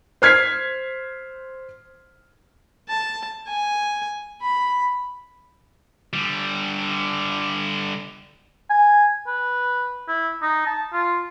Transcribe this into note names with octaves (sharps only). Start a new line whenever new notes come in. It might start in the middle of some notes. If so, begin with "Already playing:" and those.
C5 F6 G#6 B6 C7
A5
G#5
B5
D3 G3
G#5
B4
E4
D#4
A5
F4